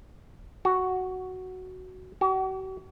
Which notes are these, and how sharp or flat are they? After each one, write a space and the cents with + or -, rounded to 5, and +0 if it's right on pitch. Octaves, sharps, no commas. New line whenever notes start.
F#4 +5
F#4 +45